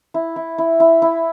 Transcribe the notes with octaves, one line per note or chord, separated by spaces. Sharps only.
E4
E4
E4
E4
E4